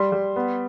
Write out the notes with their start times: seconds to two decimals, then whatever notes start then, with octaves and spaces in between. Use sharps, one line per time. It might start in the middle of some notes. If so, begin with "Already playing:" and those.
Already playing: G3 C6
0.12 G3
0.36 B3